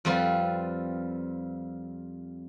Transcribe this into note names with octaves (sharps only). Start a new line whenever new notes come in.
F2 G3 C4 F4 B4